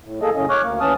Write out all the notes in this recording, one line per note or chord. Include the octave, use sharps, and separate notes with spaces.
A2
A#3 G#4 A4 D#5
F#2 A2 C#3 C#4 D#5
C#5 C#6 D6 F6 F#6
D2 A#3
D#2 E3 C#4 A5 D#6 F6